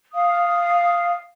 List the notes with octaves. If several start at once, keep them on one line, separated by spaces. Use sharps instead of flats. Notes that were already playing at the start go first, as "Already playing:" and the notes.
F5 D#6